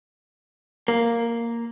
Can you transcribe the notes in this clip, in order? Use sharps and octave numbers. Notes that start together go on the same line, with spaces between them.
A#3